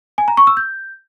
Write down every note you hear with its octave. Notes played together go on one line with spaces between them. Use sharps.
G#5
A#5
C#6
E6
G6